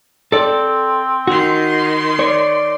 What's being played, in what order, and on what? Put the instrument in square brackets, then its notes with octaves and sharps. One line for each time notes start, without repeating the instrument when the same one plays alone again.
[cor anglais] C4 [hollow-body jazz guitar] A4 D5
[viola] D#3 C6 [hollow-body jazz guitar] F#4
[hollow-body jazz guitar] C#5 [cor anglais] D5